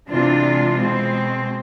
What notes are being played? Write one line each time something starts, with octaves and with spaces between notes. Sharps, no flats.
C3 E3 G#3 D4 F4
B2 G#3 C4